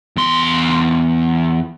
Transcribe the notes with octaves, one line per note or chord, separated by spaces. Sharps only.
E2 C6